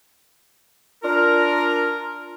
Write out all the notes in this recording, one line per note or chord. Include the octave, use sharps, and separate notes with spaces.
D4 F4 A#4